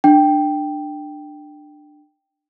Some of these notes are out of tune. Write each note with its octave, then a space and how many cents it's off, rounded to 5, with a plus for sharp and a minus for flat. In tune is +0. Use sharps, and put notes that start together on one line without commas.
D4 +20 G5 +0